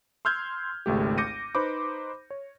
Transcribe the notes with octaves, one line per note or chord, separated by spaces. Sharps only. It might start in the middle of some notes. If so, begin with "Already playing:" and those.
C6 E6 F6 G6 G#6
G#1 C#2 A3 G4
D6 G6 A#6 C#7 D#7
D#4 B4 C5 B5 D6
C#5